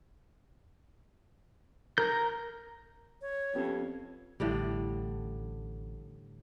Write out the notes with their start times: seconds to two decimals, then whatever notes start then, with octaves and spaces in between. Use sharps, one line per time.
1.98 A#4 A#5 G6
3.22 C#5
3.55 F2 B3 C#4 G4
4.40 A1 A2 D3 G3